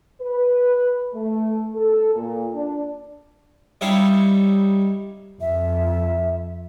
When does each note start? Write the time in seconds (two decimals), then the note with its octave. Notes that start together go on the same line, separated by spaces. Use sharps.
0.21 B4
1.14 A3
1.75 A4
2.15 A#2
2.53 D4
3.81 G3 D#4 E4 C#5 F5
5.41 F2 E5